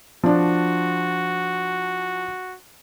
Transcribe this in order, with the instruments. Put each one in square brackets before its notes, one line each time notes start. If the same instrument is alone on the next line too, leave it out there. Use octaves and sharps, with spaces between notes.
[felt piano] F3 D4 [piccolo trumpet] F#4